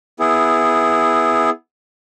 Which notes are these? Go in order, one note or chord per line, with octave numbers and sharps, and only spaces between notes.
B3 E4 G#4